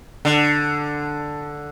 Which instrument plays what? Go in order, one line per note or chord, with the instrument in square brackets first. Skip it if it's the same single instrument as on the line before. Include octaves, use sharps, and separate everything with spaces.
[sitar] D3